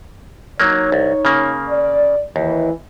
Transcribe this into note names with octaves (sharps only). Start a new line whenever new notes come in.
F#3 A#3 D#4 C#5
C2
C#3 A#3
D5
D#2 E3